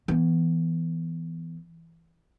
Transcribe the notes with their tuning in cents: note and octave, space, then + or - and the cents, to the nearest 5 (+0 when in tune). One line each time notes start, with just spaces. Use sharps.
E3 +0 B3 +5